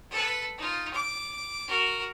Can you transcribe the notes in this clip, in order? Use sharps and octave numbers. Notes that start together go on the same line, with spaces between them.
A4 B4
D#4 F4
D6
F#4 A#4